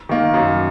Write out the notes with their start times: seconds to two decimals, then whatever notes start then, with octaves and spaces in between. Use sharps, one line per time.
0.09 D#3 A#3
0.34 F#2